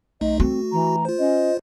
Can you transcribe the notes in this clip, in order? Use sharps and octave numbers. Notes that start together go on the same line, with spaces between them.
B1 A3 D#4 D#5
A3 C4 F#4
E3 A#5
F4 C5
C#4 D#5